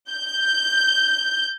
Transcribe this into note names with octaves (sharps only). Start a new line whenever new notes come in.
G6